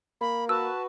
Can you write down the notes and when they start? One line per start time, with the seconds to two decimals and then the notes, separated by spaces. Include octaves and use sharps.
0.21 A#3 B5
0.49 F#4 B4 A5 E6